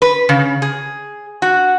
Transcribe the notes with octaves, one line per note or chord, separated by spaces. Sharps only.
B4
C#3
G#4
F#4